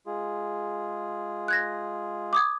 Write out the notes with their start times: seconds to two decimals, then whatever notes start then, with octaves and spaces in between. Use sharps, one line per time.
0.07 G#3 F4 G#4
1.48 F#6 G#6 A#6
2.33 D6 D#6 G#6